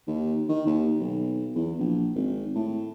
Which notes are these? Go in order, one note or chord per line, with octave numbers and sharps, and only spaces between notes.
D#2
D#3
D#2
B1
E2
A#1
G#1
A2